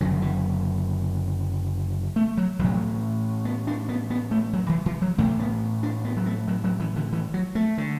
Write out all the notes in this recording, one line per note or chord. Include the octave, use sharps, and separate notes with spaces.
F#1 F#2 D3 F#3
E3
A3
F#3
A1 A2 F#3
B3
D4
B3
B3
A3
F#3
E3
E3
F#3
A1 A2 A3
B3
D4
B3
F#3
A3
F#3
F#3
E3
D3
E3
F#3
A3
D3